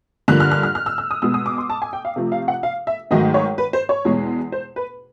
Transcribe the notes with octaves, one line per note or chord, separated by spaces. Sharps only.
G2 D3 F3 A#3 F#6
F6
F6
F6
F6
E6
E6
D#6
B2 G#3 B3 E6
D#6
D6
C6
A5
G#5
G5
F5
C3 F3 A3
F5
F#5
F5
E5
G#2 D#3 F#3 A3 D#5
C#5
B4
C5
C#5
E2 B2 G#3
C5
B4